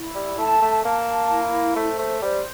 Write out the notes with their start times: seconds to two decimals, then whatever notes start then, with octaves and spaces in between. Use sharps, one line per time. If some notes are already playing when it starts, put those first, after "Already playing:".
Already playing: E4
0.15 G3
0.38 A3 A5
0.62 A3
0.84 A#3 A5
1.30 E4
1.76 A3 C5
1.99 A3
2.21 G3 C5